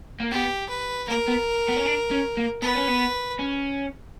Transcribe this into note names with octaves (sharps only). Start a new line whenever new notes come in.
A#3
B3 G4
B4
A#3 A#4
B3
B3
C#4
D4
C#4
A#3
B3 B4
C#4
B3
C#4